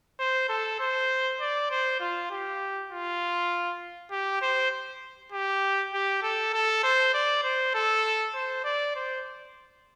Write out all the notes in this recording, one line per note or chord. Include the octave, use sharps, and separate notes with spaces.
C5
A4
C5
D5
C5
F4
G4
F4
G4
C5
G4
G4
A4
A4
C5
D5
C5
A4
C5
D5
C5